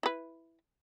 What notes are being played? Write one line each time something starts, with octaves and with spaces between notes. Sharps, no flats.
E4 B4